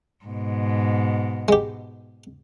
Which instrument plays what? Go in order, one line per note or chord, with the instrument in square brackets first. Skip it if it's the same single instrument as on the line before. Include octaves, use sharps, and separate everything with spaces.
[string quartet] G#2 B2
[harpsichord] G#3 G4